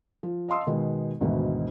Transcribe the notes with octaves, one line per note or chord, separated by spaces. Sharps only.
F3
D#5 F5 A5 C6 D#6 E6
B2 D#3 G#3 B3
D2 G#2 B2 D#3 E3